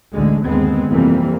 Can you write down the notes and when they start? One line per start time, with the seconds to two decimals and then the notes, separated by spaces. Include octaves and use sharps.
0.13 A1 D2 D3 G#3
0.45 G1 D#2 G#3 B3 C4
0.90 F2 C3 E3 G3 A#3 C4